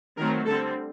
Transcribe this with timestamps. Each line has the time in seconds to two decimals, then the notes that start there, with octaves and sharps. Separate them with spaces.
0.18 D#3 F#3 A3 C4 A#4
0.46 D3 G3 C4 A4